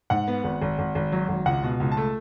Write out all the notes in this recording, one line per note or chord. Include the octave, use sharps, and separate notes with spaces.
G#2 F#5
B3
G#1
G#1
G#1
G#1
F#3
G#1
C#2 F#5
B2
C#2
A5
A3